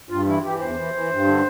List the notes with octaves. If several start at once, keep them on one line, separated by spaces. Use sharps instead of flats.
G2 F4
E3 E4
E3 G4
E2 C5
E3
E3
G2
D3